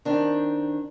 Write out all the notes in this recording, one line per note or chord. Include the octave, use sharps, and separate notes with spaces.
D#3 C4 D4